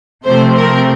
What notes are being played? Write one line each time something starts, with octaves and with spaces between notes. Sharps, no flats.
C3 F3 A3 C4 C5
A#4